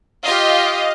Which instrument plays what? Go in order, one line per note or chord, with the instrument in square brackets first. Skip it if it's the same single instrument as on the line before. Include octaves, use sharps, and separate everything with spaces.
[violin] F4 G4 [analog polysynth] D#5 F5